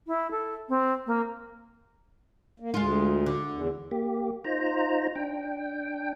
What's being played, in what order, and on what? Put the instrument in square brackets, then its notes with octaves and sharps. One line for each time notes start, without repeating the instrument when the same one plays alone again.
[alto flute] E4
A4
C4
A#3
[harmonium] A#3
[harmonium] D2 [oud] G#3 F4
[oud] D3
[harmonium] E2
[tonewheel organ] A#3 G4
D#4 F4 C5 A#5
D4 G5